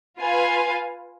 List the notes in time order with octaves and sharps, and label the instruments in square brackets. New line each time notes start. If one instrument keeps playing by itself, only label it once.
[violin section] F4 B4 F5 G#5